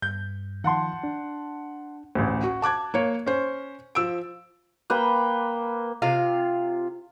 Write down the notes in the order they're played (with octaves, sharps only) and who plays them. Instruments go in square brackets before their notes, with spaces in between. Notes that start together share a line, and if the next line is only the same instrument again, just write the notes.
[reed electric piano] G2 [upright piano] G6
[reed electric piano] D#3 F3 [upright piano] F#5 A5 C6
[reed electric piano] D4
[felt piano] A1 D2
F#4
A5 D6 F#6 G#6
A#3 C#5
C#4 C5
F3 E6 D7
[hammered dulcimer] A#3 B4 G5
[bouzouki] C3 F4 F5